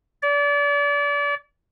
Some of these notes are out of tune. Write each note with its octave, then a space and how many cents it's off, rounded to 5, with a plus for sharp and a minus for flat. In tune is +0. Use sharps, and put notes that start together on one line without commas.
D5 -35